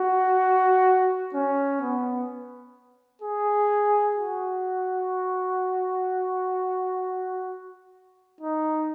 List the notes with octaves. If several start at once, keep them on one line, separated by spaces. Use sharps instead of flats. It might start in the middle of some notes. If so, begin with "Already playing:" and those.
Already playing: F#4
C#4
B3
G#4
F#4
D#4